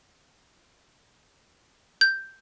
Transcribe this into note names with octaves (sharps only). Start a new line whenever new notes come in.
G6